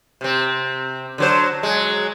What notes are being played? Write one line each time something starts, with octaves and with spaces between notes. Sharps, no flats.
C3 C4
D3 F#3 C5
F#3 G#3